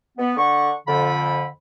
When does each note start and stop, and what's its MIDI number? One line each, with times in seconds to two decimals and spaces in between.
0.18 0.34 59
0.37 0.72 50
0.37 0.72 78
0.37 0.72 85
0.87 1.45 41
0.87 1.45 50
0.87 1.45 83